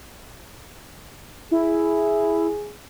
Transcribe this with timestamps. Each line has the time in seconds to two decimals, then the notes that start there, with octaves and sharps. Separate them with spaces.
1.51 E4 G#4